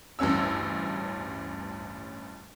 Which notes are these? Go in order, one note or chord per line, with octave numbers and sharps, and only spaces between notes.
A1 D2 G2 C#4 E6